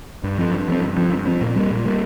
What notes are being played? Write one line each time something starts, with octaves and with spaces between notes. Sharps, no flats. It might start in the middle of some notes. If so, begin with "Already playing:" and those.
G2
F3 C4
G2
F3 C4
G2
F3 C4
G2
F3 C4
A#2
G3 A#3
A#2
G3 A#3